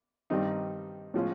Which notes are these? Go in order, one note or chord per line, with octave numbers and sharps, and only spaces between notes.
G2 D#3 G3 C4 D#4
A2 F3 G#3 C#4 F4